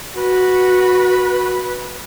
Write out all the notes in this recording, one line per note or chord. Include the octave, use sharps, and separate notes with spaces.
F#4 B4